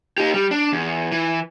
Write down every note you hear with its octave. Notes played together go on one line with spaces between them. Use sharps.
D#4 G4
G3
D4
E2
E3